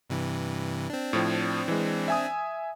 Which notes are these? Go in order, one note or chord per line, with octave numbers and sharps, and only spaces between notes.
G2 C3 E3
C4 D4
A2 F3
E3 G#3
E5 G#5 D#6